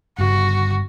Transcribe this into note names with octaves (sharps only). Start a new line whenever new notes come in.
G1 G2 C#3 F#4